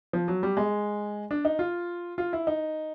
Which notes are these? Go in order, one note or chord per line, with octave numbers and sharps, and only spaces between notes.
F3
F#3
G3
G#3
D4
D#4
F4
F4
E4
D#4